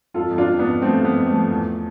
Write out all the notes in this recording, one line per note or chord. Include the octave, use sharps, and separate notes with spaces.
F2 F4 A4
F2
D4 F4
F2
B3 D4
F2
F3 A3 C4
F3
B3
F2
A3
F3
E2